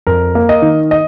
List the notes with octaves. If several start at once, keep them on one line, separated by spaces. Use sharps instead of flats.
F2 A#4
A#3
D#5
D#3
D#5